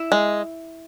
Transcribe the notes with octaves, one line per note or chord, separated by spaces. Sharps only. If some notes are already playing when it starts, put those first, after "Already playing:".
Already playing: E4 E5
G#3